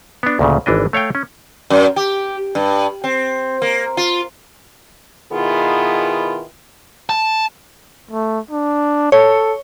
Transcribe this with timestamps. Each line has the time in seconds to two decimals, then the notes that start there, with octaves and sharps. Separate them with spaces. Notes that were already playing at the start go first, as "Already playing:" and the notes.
0.23 B3 D4
0.39 D2 A#2 C#3
0.66 G#1 E3 D4 D#5
0.93 A3 C#5 F5 G5
1.15 C#4
1.70 F#2
1.96 G4
2.55 G2
3.04 C4
3.62 A#3
3.97 F4
5.32 B2 D#3 B3 E4 F4 G#4
7.09 A5
8.11 A3
8.51 D4
9.12 A4 C#5